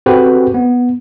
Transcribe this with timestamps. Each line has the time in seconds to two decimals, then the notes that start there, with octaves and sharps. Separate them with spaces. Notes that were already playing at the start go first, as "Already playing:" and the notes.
0.06 C4 F#4 G4 A4 B4 C5
0.54 B3